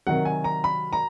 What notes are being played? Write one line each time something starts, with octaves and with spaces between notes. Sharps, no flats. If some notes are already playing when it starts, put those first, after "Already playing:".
C3 D#3 F#3 F#5
G#5
A#5
B5
A#5